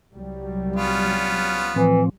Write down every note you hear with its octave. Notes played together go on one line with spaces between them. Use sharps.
C2 F#3 G3
B3 C#4 F4
A2 E3 F3 C4